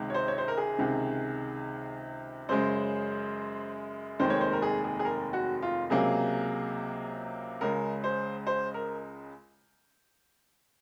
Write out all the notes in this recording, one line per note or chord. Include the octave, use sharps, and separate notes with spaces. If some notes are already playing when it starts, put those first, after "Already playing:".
Already playing: C#2 C3 D#3 G#3
C#5
C5
C#5
C5
A#4
G#4
C#2 C3 D#3
F#2 C#3 G#3 C5
F1 D#2 D#3 G#3 C5
C#5
C5
A#4
G#4
G#4
G#4
A#4
F#4
F4
C#2 C3 F#3 A#3 G#4
C#2 C#3 G#3 A#4
C5
C5
A#4